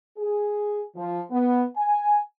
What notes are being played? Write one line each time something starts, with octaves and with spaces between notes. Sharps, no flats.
G#4
F3
B3
G#5